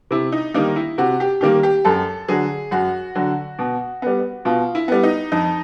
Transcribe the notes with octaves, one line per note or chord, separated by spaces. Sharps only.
C3 E4
D#4
D#3 G3 A#3 D#4
E4
C3 F#4
G4
D#3 G3 A#3 G4
G4
F#2 A4
D3 F#3 G#4
F#2 F#4
D3 F#3
B2
G3 B3
B2 F4
E4
G3 B3
D#4
F2 D#4